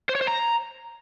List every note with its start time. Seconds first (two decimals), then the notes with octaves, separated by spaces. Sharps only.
0.09 C5
0.15 C#5
0.21 C5
0.27 A#5